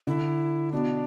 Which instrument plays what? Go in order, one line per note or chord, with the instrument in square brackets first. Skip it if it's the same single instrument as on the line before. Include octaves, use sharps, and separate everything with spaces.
[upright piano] D3 [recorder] E4
[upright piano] B2 [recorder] D4